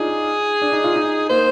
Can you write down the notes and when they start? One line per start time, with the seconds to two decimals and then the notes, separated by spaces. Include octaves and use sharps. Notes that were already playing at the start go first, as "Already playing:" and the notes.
Already playing: D4 D#4 F4 G#4
0.62 D4
0.72 D#4
0.84 F4
0.96 D#4
1.29 A#3 C5